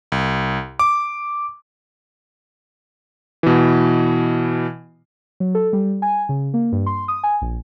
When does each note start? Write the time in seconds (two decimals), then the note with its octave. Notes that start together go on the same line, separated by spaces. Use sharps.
0.12 C2
0.79 D6
3.43 B2 E3
5.40 F#3
5.55 A4
5.73 G3
6.02 G#5
6.29 C#3
6.54 A#3
6.72 G2
6.86 C6
7.08 D#6
7.23 G#5
7.42 A#1